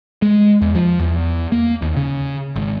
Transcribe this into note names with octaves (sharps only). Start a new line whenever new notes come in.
G#3
E2
F3
E2
A#3
D#2
C#3
G#1